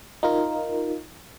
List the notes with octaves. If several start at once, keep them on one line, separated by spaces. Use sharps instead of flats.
D#4 F4 A#4